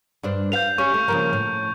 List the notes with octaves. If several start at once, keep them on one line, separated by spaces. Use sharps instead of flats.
G2 D4 C5
B4 F5 G6 F7
C#4 G4 C#6
A3
C#3 F3 A#3
A2